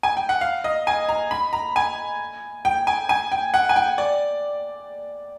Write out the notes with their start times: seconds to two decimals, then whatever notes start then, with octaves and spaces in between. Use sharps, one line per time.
0.03 G#5
0.17 G5
0.29 F#5
0.41 F5
0.64 D#5
0.87 G#5
1.09 A#5
1.31 B5
1.53 A#5
1.76 G#5
2.65 G5
2.87 G#5
3.09 G#5
3.32 G5
3.54 F#5
3.69 G#5
3.76 G5
3.98 D5